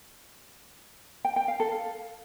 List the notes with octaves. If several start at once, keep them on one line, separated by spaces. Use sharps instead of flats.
G5
G5
F5
A4
F5